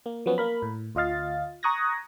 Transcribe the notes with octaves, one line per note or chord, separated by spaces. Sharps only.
A#3
F3 F#3 B3 C#4
A#3 A#4 B5
A2
D2 F4 D#5 F5 A6
A#5 C#6 D#6 F#6 G#6 A#6